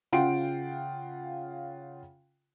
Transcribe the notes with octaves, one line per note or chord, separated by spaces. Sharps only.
C#3 F4 F#5 G5 C6 D7